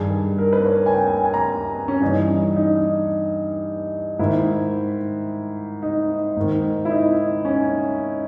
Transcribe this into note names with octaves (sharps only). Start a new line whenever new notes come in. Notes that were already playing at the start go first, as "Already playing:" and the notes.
Already playing: G2 D#3 G#4
A#4
B4
C#5
G#5
G5
G#5
G#5
A#5
C#4
G2 E3 D#4
D#4
G#2 D#3 E4
D#4
G#2 D#3
E4
D#4
C#4